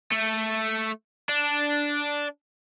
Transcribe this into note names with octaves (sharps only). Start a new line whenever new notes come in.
A3
D4